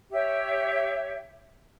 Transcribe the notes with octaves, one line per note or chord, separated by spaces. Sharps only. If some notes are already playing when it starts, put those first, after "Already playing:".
G4 C#5 E5